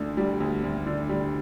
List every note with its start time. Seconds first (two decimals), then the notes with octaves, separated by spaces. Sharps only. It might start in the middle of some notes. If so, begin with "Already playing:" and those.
Already playing: D2 D3
0.17 G3
0.40 D2
0.64 D2
0.86 D3
1.09 G3